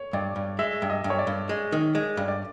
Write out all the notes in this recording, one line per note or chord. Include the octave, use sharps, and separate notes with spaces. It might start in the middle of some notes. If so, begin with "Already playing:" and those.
Already playing: C#5
G2 D5
G2
G#3 E5
G2
D#5
G2
C#5
D5
G2
G#3
D#3
G#3
G2
D5